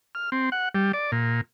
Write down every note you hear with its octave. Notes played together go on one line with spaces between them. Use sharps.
F6
C4
F#5
G3
D5
A#2